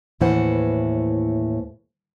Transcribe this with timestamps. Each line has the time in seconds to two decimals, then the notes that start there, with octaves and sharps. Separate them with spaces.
0.21 D#2 A2 E3 B4 C5 F#5